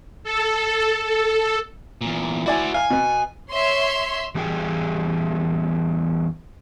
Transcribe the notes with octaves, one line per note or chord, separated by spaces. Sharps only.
A4
A4
E2 A#2
E4 F#4 C5 D5 G#5
F5 G#5 F6
B2 B3
C#5 E5 C6
E2 G3 G#4 G5